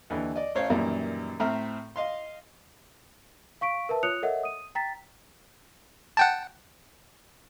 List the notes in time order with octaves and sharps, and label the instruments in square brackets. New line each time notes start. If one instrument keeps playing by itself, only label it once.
[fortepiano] D#2 D3 E3
D5 D#5
A1 C5 C#5 F5
F#2 A#2 D#3 E3 G3
A2 C4 E5 A#5 F6
D#5 F5 C6
[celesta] F5 C#6 B6 D7
A#4 B4 E5 A5
F4 C#5 D#6 F#6 C#7 F7
A4 A#4 C#5 D#5 E5 F#5
D#6 D#7
G5 A#5 A6 B6
[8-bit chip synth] F#5 G5 A5